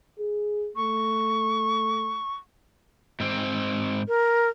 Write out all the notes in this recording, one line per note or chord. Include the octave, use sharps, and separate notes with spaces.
G#4
A3 C#6
G#2 C4
A#4